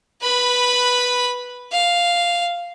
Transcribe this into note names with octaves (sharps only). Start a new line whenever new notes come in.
B4 B5
F5